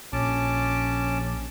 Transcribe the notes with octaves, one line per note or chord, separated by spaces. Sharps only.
A#1 C#4 A5 D6